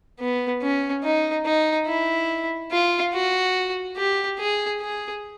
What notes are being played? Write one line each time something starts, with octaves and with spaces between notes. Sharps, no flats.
B3
C#4
D#4
D#4
E4
F4
F#4
G4
G#4
G#4